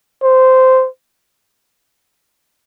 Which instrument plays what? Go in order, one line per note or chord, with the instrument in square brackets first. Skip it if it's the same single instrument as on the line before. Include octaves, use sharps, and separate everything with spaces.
[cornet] C5